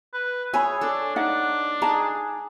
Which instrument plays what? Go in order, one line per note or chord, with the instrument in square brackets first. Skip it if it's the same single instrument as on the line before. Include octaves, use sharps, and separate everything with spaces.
[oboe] B4
[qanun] G#4 C#5 [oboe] E5 [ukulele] G#5 B5
[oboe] D4 [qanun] A4
[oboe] D4 [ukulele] D#4 F#5
[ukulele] D#4 A5 A#5 [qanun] G#4